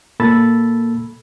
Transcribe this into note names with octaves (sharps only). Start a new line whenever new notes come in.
A#2 A#3 A4 B5 E6 A6